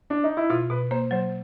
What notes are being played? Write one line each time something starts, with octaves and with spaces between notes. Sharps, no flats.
D4
D#4
E4
B2 F4
B2 B4
A#3 C5
F#3 C5